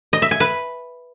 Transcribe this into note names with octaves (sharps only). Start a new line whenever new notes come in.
D#5
E5
G#5
B4